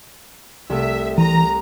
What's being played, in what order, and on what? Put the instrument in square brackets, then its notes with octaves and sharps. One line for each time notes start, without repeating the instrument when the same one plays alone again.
[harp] C2 A3 [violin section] E5
[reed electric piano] E3 [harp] C5 D#7 [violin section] A#5